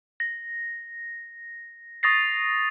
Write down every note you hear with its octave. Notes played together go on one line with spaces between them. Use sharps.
A#6
C#6 D#6 A6 A#6 C7